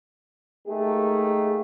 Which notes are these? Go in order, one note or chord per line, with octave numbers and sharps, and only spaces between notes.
A3 A#3 D#4 G4 G#4